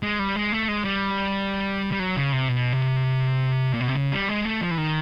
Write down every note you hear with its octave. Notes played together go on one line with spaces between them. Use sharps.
G#3
G3
G#3
A3
G#3
G3
G3
F#3
C#3
C3
B2
C3
A#2
B2
C3
C#3
G3
G#3
A3
F3
E3
D#3